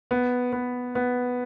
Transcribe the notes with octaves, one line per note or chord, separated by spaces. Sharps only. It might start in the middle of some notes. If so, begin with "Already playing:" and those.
B3
B3
B3